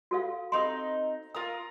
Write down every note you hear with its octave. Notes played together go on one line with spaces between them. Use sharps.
F#4 A4 F5
C4 D#4 A4 C6
F4 A#4 D#6